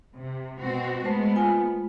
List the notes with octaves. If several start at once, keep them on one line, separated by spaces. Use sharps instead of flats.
C3
B2 C4 F#4
G#3 A3 B3 C5
F4 G#5